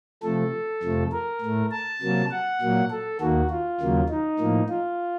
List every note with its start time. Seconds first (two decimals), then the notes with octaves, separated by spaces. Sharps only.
0.23 C3 F3 A3 A4
0.83 F2 C3 F3 A3
1.13 A#4
1.42 A2 A3
1.72 A5
2.02 C3 F#3 A#3
2.31 F#5
2.61 A#2 F#3 A#3
2.90 A4
3.21 D#2 D#3 A#3 F#4
3.50 F4
3.80 D#2 C#3 F#3 A#3
4.09 D#4
4.39 A2 F3 A#3
4.69 F4